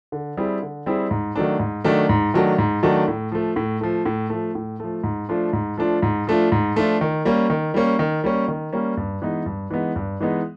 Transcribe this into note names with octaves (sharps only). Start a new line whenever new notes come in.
D3
G3 C4 E4 G#4
D3
G3 C4 E4 G#4
G#2
D#3 F#3 A3 D4
G#2
D#3 F#3 A3 D4
G#2
D#3 F#3 A3 D4
G#2
D#3 F#3 A3 D4
A2
F3 A3
A2
F3 A3
A2
F3 A3
A2
F3 A3
G#2
F3 A3 D4 F4
G#2
F3 A3 D4 F4
G#2
F3 A3 D4 F4
G#2
F3 A3 D4 F4
D#3
G3 A#3 C#4
D#3
G3 A#3 C#4
D#3
G3 A#3 C#4
D#3
G3 A#3 C#4
G2
E3 G#3 B3 D#4
G2
E3 G#3 B3 D#4
G2
E3 G#3 B3 D#4